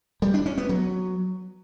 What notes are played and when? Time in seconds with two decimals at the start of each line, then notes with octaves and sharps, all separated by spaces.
0.22 G3
0.34 D4
0.46 C#4
0.58 B3
0.69 F#3